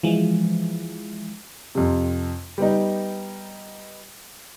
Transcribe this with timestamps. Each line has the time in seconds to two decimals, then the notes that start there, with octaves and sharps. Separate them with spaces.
0.03 E3 F3 G#3
1.75 F2 C3
2.58 G3 B3 D#4